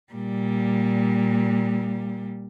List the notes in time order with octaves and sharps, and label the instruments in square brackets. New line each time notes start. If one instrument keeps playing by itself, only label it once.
[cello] A#2 G3